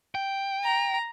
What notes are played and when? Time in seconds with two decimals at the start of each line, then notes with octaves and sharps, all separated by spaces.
0.15 G5
0.63 A#5